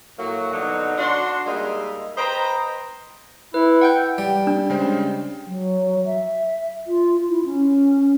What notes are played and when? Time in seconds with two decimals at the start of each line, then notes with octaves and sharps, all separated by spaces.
0.18 A2 F#3 A#3 F#4
0.52 B2 D3 F#3 D#4
0.97 D4 F#4 C6
1.46 G3 G#3 A#3 D#4 D#5 E5
2.16 B4 C5 D#5 G5 A#5
3.54 E4 B4
3.81 F#5 G5 G6
4.18 G3 D7
4.47 D4
4.70 C#3 G#3 C5
5.47 F#3
6.05 E5
6.87 F4
7.29 E4
7.45 C#4